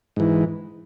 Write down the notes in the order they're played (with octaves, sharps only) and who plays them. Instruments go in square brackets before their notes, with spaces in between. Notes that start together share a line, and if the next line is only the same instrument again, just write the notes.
[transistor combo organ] G#2 E3